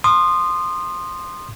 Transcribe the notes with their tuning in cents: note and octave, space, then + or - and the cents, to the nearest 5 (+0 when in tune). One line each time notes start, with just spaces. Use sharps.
C6 +5 D#6 -25